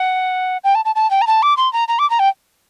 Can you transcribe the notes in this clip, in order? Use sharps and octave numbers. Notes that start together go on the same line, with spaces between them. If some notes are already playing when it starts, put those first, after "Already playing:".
Already playing: F#5
G5
A5
A5
A5
G5
A#5
A5
D6
C6
A#5
A#5
D6
A#5
G5